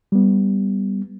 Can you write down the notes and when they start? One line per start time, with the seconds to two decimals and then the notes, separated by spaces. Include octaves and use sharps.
0.12 G3 B3